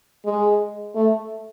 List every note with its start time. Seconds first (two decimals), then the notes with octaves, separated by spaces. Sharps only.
0.25 G#3
0.95 A3